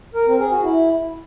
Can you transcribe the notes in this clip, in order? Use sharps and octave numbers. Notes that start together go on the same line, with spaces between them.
A#4
C4
G#4
F#4
E4